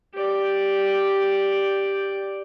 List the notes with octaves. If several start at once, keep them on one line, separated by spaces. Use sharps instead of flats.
G4 D5